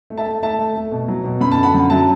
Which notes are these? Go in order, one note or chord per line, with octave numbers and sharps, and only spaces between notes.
A3
E5 A5
A3
A3 E5 A5
A3
A3
B2
F#3
B2
F#2 B5
A5
D3
F#5 B5
F#2
F#3 E5 A5